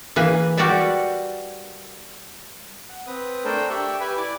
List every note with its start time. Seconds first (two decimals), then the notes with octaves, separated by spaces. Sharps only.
0.16 E3 A#3 B4 G#5
0.57 G3 F#4 A#4 B4 D5 E5
2.89 F#5
3.07 C4 B4 D#6
3.45 A3 D4 A4 A#4 C5 G5
3.70 G4 D5 E5 G5 C#6 E6
4.00 G4 B4 E5 G#5 B5
4.17 E4 D5 G#5 D6